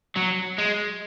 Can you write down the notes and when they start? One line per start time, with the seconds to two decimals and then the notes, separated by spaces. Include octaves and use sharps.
0.17 F#3
0.59 G#3